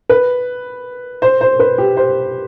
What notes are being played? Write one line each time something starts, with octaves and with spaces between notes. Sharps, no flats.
B4
C5
C5
B4
G4
C5